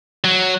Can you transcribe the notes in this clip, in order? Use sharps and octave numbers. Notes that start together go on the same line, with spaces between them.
F#3